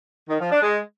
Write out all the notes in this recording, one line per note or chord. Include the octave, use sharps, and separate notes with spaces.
D#3
F3
D4
G#3